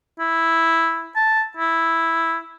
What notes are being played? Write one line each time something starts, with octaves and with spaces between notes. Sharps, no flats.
E4
A5
E4